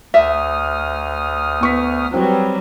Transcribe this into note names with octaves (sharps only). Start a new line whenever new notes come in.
D2 E5 D#6 F6
B3 C#6 B6
F#3 G3 C4 B4